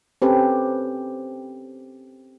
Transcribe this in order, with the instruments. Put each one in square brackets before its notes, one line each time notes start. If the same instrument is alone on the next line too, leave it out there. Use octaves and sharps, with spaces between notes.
[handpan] C4 C#4 G4 A4 B4